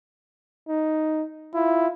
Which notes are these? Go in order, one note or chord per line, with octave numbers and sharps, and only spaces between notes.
D#4
E4 F4